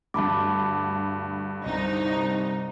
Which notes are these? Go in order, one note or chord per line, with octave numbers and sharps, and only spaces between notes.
D2 G2 A5 B5 D6
C2 D#4